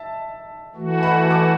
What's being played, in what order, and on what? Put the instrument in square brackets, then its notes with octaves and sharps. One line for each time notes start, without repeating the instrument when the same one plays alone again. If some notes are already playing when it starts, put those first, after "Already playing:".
Already playing: [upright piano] E5 A5
[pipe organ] E3 A3 F#4
[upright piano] F#5 B5
A5 D6